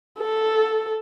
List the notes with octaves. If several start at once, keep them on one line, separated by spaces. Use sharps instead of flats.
A4